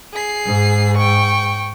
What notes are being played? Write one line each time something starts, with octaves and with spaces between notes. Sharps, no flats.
G#4 C7
G#2
G5 C#6